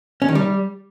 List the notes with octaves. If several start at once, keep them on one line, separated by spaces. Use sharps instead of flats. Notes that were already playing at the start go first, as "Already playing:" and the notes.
C#4
D#3
G3